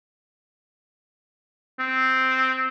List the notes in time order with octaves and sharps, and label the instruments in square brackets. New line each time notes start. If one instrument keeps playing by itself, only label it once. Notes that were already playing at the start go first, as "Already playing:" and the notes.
[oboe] C4